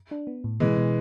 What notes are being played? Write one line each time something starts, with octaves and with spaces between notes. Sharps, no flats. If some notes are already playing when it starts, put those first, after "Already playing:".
D4
B3
A2
B2 E3 G#3
B2